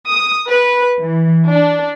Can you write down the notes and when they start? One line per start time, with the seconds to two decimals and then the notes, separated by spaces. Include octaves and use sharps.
0.10 D#6
0.49 B4
0.98 E3
1.48 D4